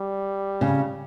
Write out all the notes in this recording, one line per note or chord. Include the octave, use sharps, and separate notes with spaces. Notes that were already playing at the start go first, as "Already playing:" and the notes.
Already playing: G3
C#3